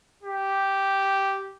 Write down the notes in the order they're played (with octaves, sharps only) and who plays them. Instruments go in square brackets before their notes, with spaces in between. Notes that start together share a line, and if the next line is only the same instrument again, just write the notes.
[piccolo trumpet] G4